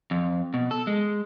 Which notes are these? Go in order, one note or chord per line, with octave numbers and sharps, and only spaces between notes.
F2
B2
A4
G#3